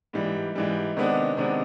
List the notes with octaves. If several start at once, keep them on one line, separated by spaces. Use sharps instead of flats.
G#2 E3 G3
G#2 E3 G3
C3 D#3 G#3 B3 D4
C3 D#3 G#3 B3 D4